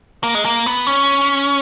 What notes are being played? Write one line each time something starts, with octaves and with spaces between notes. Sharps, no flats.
A#3
G#3
A#3
B3
C#4